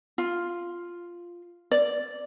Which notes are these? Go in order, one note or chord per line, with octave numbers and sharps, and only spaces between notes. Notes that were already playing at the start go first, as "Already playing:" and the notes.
F4
D5